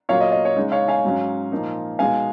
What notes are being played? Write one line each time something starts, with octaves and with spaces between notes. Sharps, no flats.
A#2 F#3 A#3 C#5 F5
D#5
D#5
C#5
C#3 G#3 D#4
C#5 F5
F5 G#5
G#2 F#3 C#4
A#2 F3 A#3 D#4
B2 G#3 B3 D#4 F5 G#5